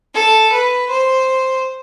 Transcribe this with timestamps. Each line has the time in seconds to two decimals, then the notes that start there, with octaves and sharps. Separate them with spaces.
0.14 A4
0.53 B4
0.90 C5